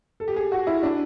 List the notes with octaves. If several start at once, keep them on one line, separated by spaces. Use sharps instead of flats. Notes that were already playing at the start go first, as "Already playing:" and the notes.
A4
G4
G#4
F#4
E4
D4